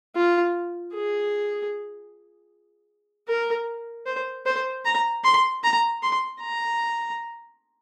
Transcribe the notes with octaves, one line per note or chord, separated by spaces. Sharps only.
F4
G#4
A#4
C5
C5
A#5
C6
A#5
C6
A#5